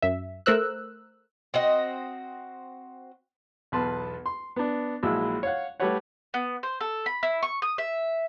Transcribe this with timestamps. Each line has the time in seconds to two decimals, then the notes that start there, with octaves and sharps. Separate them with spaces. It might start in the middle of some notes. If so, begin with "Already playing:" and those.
0.02 F#2 E5
0.46 A3 A#4 C5 E6 F#6
1.54 C4 F#4 D#5
3.72 B1 E2 B4 A5 C6
4.26 C6
4.56 B3 D4
5.03 A#1 F#3 G#3 E4 E6
5.43 C#5 F5 F#5
5.80 G3 A3 G4 B4 C#5 F#5
6.34 B3
6.63 C5
6.80 A4
7.06 B5
7.23 E4
7.43 C#6
7.62 D#6
7.78 E5